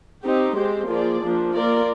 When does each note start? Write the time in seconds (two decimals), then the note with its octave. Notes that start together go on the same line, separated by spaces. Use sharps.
0.23 C4 D#4 G4
0.56 G#3 C4 G4 C5
0.88 F3 A#3 F4 G#4 D5
1.22 F3 A#3 D4
1.55 A#3 F4 A#4 D5